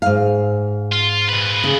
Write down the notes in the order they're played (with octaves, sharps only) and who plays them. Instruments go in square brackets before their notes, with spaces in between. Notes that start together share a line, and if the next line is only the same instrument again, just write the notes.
[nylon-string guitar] G#2 F5
[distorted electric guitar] F4
A#2 B4
[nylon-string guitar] C#3